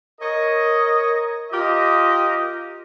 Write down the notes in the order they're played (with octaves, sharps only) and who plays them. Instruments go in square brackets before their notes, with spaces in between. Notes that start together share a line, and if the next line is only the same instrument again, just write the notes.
[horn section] A#4 C#5 D#5
F4 G4 A#4 D#5